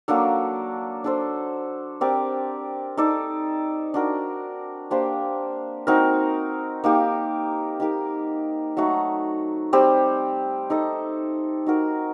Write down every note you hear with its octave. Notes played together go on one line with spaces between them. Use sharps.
F#3 A#3 D4 A4
D4 A4 C5
C4 G4 A#4 D5
D#4 A4 D5
D4 F#4 A#4
A#3 D4 G4 C5
C4 D#4 F#4 A#4
A#3 D#4 G4
D#4 G4 A#4
F#3 A3 D#4 F#4
G3 C4 G4 C5
D#4 A4 D#5
D#4 F#4 A#4